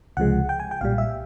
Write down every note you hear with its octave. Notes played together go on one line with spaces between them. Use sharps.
C#2 C3 F3 G#3 F#5
G5
G#5
G5
B1 A#2 G3 F5
E5